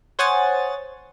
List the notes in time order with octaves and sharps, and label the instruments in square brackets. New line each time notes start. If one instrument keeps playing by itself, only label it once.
[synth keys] C5 C#5 F#5 G#5 D#6 A6